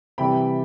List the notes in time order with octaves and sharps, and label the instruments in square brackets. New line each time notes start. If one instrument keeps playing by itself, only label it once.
[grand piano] C3 E3 G3 G5 B5